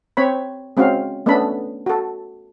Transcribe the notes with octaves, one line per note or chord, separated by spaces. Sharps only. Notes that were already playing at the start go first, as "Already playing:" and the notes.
C4 C#5 B5
G#3 C4 C#4 F#4 F5
A3 B3 C#4 D4 A4 B5
F#4 A4